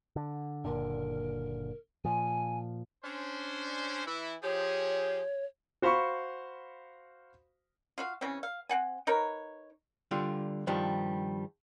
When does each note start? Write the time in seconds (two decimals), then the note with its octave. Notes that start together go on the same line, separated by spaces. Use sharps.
0.16 D3
0.65 F#1 A#2 D3 A#4
2.05 A#2 F3 G#5
3.05 C#4 D4 C5
4.06 E3 E4
4.43 F3 G4 G#4 C#5
5.82 F#4 C5 F5 B5 C#6
7.98 F4 F#4 F5
8.21 C#3 E3 C4 C#4
8.43 F5
8.69 C4 F#5 G#5
9.07 D#4 A#4 B4 C#5
10.11 D3 G3 F4
10.67 G2 D#3 F3 G3